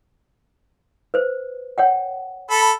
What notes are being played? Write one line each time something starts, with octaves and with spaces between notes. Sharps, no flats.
B4 C5
C#5 F#5 G5
A4 B5